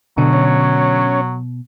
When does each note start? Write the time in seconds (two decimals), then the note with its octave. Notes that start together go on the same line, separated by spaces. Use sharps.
0.18 B2 D3 F#3
0.33 C#4 C#5